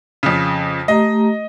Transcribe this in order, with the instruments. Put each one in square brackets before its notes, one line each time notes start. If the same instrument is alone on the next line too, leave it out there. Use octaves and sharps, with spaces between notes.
[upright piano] F2 C#3
[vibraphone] A3 G4 A#5 [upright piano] D#5